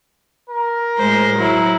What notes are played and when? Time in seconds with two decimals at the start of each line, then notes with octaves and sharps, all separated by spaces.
0.50 A#4
0.98 A2 G#3 C5
1.37 F#3 E4